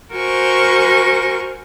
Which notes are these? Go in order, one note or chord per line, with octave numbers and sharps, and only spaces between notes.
F#4 A#4 C5 G#5 C#6